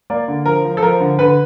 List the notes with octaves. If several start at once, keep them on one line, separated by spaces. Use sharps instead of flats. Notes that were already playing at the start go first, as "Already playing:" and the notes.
A#3 D5
D3
F3 A#4
F3
A4
F3 A#4
D3
D3 B4